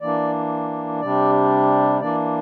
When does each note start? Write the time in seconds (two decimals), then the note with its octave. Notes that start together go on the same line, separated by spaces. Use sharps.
0.01 E3 A#3 D4 D5
1.01 C3 G3 D4 D5
2.01 E3 A#3 D4 D5